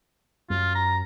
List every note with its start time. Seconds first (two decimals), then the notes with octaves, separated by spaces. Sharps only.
0.50 F#2 F4
0.75 A#5